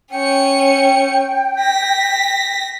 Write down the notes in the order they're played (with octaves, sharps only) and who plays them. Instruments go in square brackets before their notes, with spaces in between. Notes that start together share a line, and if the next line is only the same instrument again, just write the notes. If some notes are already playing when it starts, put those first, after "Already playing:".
[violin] C#4 C#7 [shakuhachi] G5
[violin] A#6 B6